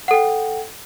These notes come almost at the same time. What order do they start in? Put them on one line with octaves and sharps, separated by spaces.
F#5 A4 G5